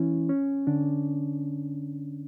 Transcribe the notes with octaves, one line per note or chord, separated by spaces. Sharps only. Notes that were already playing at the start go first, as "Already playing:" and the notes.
Already playing: E3 C#4 E4
C#4
D3 D4